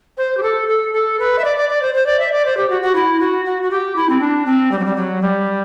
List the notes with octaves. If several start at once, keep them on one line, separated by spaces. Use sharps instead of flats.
C5
G4
A4
A4
A4
B4
E5
D5
D5
D5
C5
C5
D5
E5
D5
C5
G4
F#4
F#4
E4
F#4
F#4
F#4
G4
E4
C4
D4
C4
G3
F#3
G3
F#3
G3